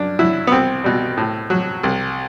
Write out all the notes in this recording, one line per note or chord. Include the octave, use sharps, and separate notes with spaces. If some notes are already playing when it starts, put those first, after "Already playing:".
Already playing: F#2 D4
F#3 E4
B3
C2 C4
B2 G3
A2
F#3
C2